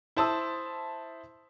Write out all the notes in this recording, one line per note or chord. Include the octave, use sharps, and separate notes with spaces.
E4 C5 A5 D#6 E6